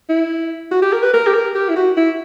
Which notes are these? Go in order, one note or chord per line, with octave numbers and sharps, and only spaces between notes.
E4
F#4
G4
A#4
B4
A#4
G4
A#4
G4
E4
F#4
E4